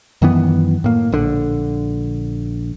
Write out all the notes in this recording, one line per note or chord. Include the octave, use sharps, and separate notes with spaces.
F#2 D#3 E3 B3
A2 A#3
A#1 D3